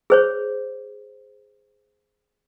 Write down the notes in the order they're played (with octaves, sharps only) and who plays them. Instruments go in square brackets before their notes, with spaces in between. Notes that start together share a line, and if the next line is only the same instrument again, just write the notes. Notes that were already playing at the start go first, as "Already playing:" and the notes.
[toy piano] G#4 C5 C#5